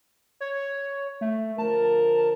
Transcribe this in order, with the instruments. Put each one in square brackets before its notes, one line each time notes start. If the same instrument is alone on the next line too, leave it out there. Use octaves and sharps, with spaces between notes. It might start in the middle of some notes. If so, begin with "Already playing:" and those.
[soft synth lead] C#5
A3
[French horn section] D3 F3 A#4 [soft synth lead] A5